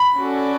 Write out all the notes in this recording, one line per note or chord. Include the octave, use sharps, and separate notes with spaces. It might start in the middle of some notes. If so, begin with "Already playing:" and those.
Already playing: B5
C#4 F#4 A4 D5